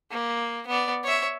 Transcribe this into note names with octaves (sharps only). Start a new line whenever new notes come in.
A#3
B3 D5
C#5 E5